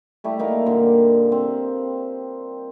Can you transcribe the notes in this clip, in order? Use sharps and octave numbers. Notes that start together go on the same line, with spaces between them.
G3 A3 E4 G4
A#3 D#4 A#4 F5
A#2 D3
C4